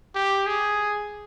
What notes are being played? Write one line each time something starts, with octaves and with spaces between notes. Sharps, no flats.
G4
G#4